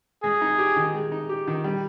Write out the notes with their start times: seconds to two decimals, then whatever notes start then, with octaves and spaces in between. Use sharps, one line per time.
0.23 G#3 G#4
0.42 D#4
0.58 G4
0.76 D#3
0.94 G#3
1.12 D#4
1.29 G4
1.47 D#3
1.64 G3